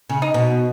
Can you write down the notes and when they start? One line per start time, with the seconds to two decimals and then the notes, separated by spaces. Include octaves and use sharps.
0.09 C#3
0.22 D#4
0.34 B2